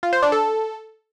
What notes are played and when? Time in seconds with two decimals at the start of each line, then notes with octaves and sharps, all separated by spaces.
0.03 F4
0.13 C5
0.22 D4
0.32 A4